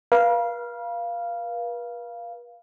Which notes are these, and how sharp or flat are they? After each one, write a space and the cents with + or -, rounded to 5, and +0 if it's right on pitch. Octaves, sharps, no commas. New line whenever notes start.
B4 -45 F5 -10